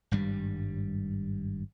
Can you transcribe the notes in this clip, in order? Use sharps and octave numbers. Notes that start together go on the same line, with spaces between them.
G#1 G2 G3